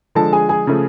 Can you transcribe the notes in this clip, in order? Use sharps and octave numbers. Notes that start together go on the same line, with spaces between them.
D3 F3 G#3 A4 A5
G#4 G#5
G#4 G#5
C#3 F3 A3